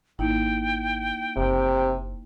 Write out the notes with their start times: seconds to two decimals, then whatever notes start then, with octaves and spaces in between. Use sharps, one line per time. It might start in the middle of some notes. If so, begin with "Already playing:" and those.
0.19 G#1 A#3 D#4 E4 G5
1.37 F#1 C3